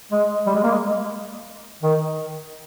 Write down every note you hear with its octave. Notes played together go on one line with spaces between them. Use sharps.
G#3
G3
G#3
A#3
G#3
D#3